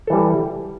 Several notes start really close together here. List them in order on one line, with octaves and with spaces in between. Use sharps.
A4 E3 G3